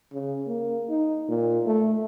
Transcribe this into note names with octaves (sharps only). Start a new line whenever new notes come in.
C#3
A#3
D#4
A#2
A3